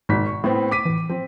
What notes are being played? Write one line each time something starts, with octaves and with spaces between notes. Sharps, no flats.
G#1 G#2 B2 B6
C#6
A2 B3 C4 E4
D6 B6 D#7
A2 E3
F3 C4